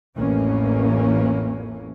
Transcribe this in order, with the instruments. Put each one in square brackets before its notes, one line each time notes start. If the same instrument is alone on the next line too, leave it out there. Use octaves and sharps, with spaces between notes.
[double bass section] A1 F2 E3 A3 A#3 C#4